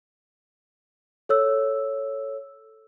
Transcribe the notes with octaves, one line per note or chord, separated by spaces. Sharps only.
A4 C#5 E6